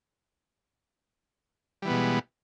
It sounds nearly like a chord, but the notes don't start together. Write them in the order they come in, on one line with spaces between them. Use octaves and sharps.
G3 E3 B3 B2 G#3